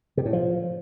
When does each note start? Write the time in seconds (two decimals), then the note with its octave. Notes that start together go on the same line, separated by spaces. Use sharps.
0.17 C3
0.25 A2
0.33 F3